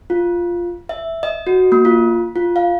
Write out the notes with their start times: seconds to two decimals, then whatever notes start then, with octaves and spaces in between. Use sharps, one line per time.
0.10 F4
0.89 E5
1.23 D#5
1.47 F#4
1.72 A#3
1.85 F4
2.36 F4
2.56 F5